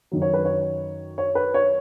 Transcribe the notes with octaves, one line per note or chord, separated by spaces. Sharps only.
F#2 D#3 F#3
C#5
B4
C#5
C#5
B4
C#5